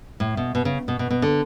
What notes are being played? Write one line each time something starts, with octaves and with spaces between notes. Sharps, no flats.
A2
B2
B2
C#3
B2
B2
B2
D3